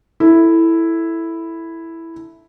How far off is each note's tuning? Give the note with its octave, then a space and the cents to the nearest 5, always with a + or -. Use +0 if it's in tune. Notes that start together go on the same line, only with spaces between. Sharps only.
E4 +0 A4 +0